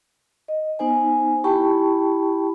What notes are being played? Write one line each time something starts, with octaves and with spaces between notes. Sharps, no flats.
D#5
B3 D#4 C5 G#5
E4 G4 G5 A5 B5 C#6